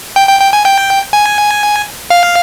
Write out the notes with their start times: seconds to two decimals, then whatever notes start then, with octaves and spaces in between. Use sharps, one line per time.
0.16 G5
0.28 G5
0.40 G5
0.53 G#5
0.65 G5
1.13 G#5
2.10 F5